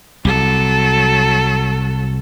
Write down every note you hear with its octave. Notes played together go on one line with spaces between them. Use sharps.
C2 F#3 A4